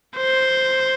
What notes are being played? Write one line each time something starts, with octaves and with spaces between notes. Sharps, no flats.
C5